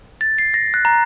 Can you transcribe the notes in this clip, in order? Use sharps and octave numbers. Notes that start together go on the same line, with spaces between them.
A6
C7
A#6
F#6
A#5